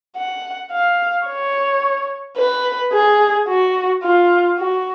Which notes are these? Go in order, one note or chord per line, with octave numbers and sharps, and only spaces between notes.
F#5
F5
C#5
B4
G#4
F#4
F4
F#4